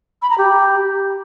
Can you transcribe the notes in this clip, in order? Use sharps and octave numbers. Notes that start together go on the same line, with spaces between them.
B5
A#5
G4